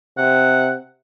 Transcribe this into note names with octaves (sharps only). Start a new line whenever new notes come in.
C3 F#5